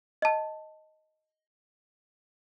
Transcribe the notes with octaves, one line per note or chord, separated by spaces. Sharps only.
D#5 A5